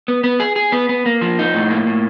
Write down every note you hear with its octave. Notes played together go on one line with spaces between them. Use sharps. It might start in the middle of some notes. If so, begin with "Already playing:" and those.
B3
B3
G#4
G#4
B3
B3
A#3
F3
D#4
A2
A#3
A2